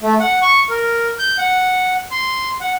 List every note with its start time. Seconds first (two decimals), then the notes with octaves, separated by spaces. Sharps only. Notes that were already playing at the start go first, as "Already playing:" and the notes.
0.01 A3
0.20 F#5
0.42 C#6
0.70 A#4
1.19 G6
1.38 F#5
2.11 C6
2.61 F#5